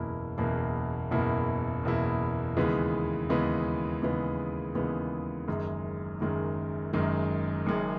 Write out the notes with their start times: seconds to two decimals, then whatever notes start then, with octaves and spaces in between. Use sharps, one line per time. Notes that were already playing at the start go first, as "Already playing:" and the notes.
Already playing: F#1 E2 B2 A#3 E4
0.38 F#1 E2 B2 A#3 E4
1.11 F#1 E2 B2 A#3 E4
1.83 F#1 E2 B2 A#3 E4
2.57 D#2 C#3 E3 G#3 B3
3.29 D#2 C#3 E3 G#3 B3
4.02 D#2 C#3 E3 G#3 B3
4.75 D#2 C#3 E3 G#3 B3
5.48 F#1 F#2 D#3 G#3
6.20 F#1 F#2 D#3 G#3
6.93 F#1 F#2 D#3 G#3
7.66 F#1 F#2 D#3 G#3